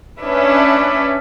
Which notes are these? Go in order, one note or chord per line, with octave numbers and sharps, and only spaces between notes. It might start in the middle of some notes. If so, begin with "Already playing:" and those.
C#4 D4 B4 E5